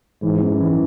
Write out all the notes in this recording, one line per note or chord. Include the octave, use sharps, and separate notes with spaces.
G#2 E3
F#2
E3